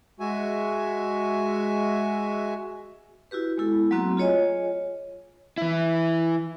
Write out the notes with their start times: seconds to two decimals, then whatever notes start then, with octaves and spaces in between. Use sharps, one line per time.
0.20 G#3 F#4 E5 G#5
3.31 E4 F#4 G4 B4
3.58 G#3 B3 E4 A4
3.91 F#3 A3 A#3 C4 F#4
4.17 F4 G#4 C#5 D#5 G#5
5.58 E3 E4